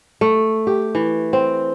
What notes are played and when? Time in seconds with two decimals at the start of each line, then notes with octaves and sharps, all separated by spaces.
0.21 A3
0.67 G4
0.95 E3
1.33 C4